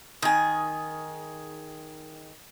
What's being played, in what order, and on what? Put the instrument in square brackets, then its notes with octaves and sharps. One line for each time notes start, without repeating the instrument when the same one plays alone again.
[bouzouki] D#3 G#4